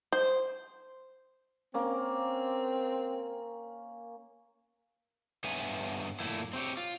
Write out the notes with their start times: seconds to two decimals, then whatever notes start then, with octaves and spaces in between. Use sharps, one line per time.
0.12 C5
1.74 A#3 C4 C#4
5.44 G2 B3 C#5 E5 G#5
6.20 F#2 A#2 D3 A3 E4
6.53 C4 G4 C#5
6.77 F4